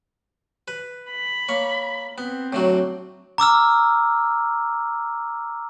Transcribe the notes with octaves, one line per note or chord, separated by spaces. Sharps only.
B4
B5
A#3 C#5
B3 C4
A2 D3 F#3
A#5 D6 E6 F6